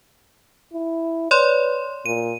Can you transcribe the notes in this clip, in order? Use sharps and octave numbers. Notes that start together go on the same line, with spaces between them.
E4
B4 C#5 D5 C6
A#2 D#7